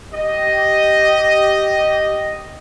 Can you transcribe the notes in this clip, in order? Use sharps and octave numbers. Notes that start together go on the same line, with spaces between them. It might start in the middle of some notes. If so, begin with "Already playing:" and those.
G4 D#5